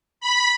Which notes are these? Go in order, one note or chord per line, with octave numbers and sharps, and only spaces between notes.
B5